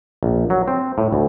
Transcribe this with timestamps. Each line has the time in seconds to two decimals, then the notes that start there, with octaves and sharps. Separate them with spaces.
0.23 A#1
0.50 F#3
0.68 C4
0.98 A2
1.13 D2